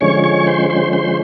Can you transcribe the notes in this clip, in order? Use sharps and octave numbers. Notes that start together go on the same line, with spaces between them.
D3 F3 G#3 C#4 C#5 C#6
C#5 C#6
C5 C6
C5 C6
C5 C6